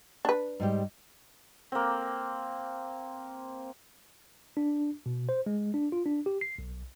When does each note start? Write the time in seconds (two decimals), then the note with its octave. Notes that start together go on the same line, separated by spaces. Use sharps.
0.25 D4 B4
0.60 G#2 G3 G4
1.72 A#3 C4
4.57 D4
5.06 B2
5.29 C5
5.46 G#3
5.74 D4
5.92 F4
6.06 D4
6.26 G4
6.41 C7
6.59 B1